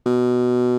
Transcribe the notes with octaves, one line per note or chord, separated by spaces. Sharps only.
B2